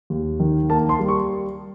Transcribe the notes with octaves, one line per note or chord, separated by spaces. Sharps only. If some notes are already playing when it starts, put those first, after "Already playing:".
D#2
D#3
A#3 A5
C6
G3
C#6